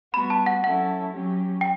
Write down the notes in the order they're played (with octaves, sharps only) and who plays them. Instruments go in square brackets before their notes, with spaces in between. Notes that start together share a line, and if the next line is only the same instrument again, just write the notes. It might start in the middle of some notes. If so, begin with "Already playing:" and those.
[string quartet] G3 B3 F#4 [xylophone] B5
[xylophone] A5
F#5
[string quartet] F#3 C#4 E4 A4 [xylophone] F#5
[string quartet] F#3 C#4 G4
[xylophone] G5